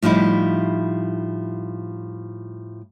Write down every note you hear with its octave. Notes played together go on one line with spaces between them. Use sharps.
A2 F3 G3 D#4 E4